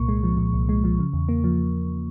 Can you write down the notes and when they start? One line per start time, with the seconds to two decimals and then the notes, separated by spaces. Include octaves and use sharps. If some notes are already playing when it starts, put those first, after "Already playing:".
Already playing: C2 A#2 A#3 C#6
0.08 G#3
0.24 F3
0.38 A#2
0.54 C2
0.69 G#3
0.84 F3
0.99 C#3
1.13 E2
1.29 A#3
1.44 F3